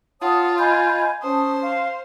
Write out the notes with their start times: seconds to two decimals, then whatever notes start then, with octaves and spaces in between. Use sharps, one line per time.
0.21 F4 C#5 F#5 A5 D#6
0.58 D#5 G#5 B5 G6
1.22 C#4 C5 A5 D#6
1.62 F5